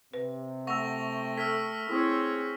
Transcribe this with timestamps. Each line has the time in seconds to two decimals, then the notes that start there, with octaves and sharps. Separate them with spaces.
0.14 C3 B4
0.67 A3 F#5 G5 C#6 E6 A#6 F7
1.38 A4 E6 F6 B6
1.89 C4 E4 G#4 C#5